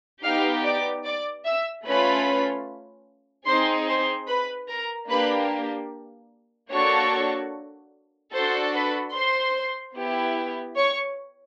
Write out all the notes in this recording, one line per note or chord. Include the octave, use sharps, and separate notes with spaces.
B3 D#4 G4 F5 F6
D5 D6
D5 D6
E5 E6
A3 C#4 F4 B4 B5
C4 D#4 G#4 C5 C6
C5 C6
B4 B5
A#4 A#5
A#3 D4 G4 B4 B5
A#3 D4 F#4 A4 C#5 C#6
D4 F#4 A4 C5 C6
B4 B5
C5 C6
B3 E4 G4
C#5 C#6